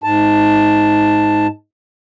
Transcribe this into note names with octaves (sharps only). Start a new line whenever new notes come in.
G#2 A5